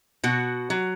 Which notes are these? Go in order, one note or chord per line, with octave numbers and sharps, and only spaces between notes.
B2 F#4
F#3